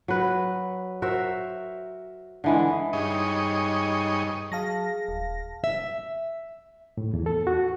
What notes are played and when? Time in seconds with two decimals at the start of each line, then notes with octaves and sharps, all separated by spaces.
0.08 F#3 B4
1.02 F#4 A#4 C5 E5
2.44 D3 E3 G#3
2.93 G2 D#4 G#4 C#5 D#5
4.52 F#3 G#4 F5 A5 A#6
5.08 D#1
5.64 E5
6.97 A2
7.14 E2
7.26 A4
7.47 F#4